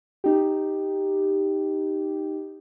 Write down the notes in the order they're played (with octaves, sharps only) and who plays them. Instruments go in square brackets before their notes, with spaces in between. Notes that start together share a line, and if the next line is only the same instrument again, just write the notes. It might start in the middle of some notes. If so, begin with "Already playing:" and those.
[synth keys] D#4 G4